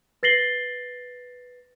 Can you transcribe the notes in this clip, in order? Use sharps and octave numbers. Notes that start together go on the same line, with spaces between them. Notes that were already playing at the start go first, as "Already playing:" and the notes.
B4 A6 A#6 C7 F#7 G7